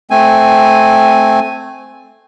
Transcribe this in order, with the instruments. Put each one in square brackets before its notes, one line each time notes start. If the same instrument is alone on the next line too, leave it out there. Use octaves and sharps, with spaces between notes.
[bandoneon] A3 C4 G#5